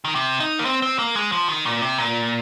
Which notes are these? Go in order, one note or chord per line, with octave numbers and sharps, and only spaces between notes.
D#3
C3
D#4
A#3
C4
C4
A#3
G#3
F3
D#3
A#2
C3
A#2